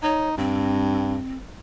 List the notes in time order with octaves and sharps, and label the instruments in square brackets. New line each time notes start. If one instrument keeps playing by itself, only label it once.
[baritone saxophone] D#4 [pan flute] C#5
[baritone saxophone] G2 [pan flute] C4